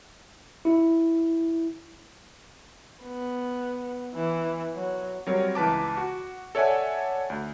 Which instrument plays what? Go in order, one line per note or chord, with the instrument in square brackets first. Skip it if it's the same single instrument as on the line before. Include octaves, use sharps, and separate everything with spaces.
[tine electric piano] E4
[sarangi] B3
E3
F#3
[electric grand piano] F#3 G3 C4 A#4 C#5
C#2 E3 B4 A5 D6
F#4
A4 C#5 D5 E5 F#5 G#5
D2